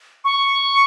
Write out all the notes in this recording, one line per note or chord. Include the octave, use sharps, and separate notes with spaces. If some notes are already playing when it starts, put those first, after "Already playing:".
C#6